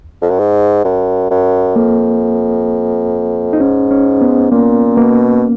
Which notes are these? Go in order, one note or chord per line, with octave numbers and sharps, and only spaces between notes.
F2
F#2
G#2
F#2
F#2
F2 A#3
D#4
G#2 C#4
C#4
B3
A#2 A#3
B2 A#3